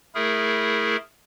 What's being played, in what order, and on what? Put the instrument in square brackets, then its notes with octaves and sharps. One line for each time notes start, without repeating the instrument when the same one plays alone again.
[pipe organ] A3 E4 G#4 A#4